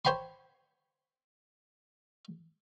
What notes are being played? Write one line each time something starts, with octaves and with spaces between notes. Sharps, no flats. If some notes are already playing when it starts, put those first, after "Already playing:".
C5 C#5 G5 B5 C6